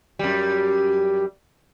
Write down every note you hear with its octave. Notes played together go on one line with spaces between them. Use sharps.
F#2 G3